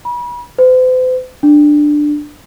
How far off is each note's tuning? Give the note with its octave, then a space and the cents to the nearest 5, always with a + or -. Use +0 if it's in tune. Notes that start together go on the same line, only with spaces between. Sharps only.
B5 -35
C5 -45
D4 +10